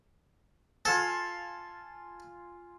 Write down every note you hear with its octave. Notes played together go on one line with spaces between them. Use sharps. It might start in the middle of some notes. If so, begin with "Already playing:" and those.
F4 A4 F5 G#5